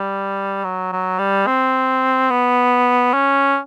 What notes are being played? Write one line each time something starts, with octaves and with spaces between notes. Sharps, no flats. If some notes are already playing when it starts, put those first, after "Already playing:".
Already playing: G3
F#3
F#3
G3
C4
B3
C#4